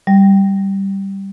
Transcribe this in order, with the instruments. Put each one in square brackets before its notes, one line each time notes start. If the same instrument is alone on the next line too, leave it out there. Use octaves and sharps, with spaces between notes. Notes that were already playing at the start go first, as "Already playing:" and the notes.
[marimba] G3